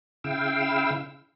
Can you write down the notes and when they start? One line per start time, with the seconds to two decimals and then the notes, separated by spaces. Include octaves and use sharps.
0.24 C#3 E4 F5 G5 E6